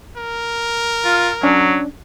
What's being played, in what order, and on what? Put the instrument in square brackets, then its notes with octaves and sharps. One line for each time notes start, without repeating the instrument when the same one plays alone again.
[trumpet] A#4
[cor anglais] F4
[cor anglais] F#3 [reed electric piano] C#4 D4